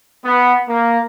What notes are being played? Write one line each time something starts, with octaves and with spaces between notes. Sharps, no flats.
B3
A#3